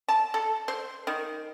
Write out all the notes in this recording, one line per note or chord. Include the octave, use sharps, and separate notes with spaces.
A5
A4
C5
D#3